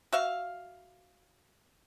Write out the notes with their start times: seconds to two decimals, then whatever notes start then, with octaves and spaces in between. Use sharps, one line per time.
0.13 F#4 E5 F5